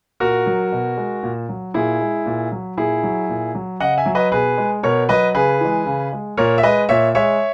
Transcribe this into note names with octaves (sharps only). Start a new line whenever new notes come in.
A#2 F#4 A#4
F#3
B2
G#3
A#2
F#3
A#2 E4 G#4
G#3
A#2
F#3
A#2 E4 G#4
F#3
A#2
F#3
C#3 D#5 F#5
E5 G#5
F#3
B4 D#5
B2 G#4 B4
G#3
B2 A#4 C#5
F#3 B4 D#5
C#3 G#4 B4
E3 G#3
C#3
G#3
A#2 A#4 C#5
E5
G#3 B4 D#5
A#2 C#5 E5
G#3 C#5 E5